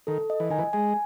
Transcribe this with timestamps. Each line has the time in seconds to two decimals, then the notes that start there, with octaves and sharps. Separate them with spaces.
0.07 D#3 A4
0.30 D#5
0.40 E3
0.50 D#3 G#5
0.58 E3
0.73 G#3 G#5